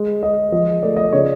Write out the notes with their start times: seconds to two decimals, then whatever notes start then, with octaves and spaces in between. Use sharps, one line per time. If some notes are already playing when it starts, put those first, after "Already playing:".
Already playing: G#3
0.22 G#3 D#5
0.52 F3 D#5
0.83 A3 D5
0.96 D#5
1.04 D5
1.13 C#3 C#5